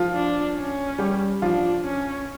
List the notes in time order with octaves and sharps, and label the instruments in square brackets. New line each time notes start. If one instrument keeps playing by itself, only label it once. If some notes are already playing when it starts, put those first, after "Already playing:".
Already playing: [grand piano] F3 F4
[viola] D4
C#4
[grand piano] G3 G4
[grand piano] F3 F4 [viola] D4
[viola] C#4